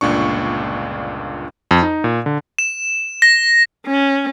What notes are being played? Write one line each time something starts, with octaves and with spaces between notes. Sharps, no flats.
G1 C#2 A#2 D4 C#6
F2
D#4
A#2
D3
E7
A#6
C#4